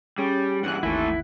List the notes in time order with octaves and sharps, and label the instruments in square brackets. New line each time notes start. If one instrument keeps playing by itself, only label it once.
[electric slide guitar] G3 [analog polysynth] C#4 G#4
[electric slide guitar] G2 E3 [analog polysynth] F#5 F#6
[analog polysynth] G#1 D#2 [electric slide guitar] E3 A3 [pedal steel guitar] E4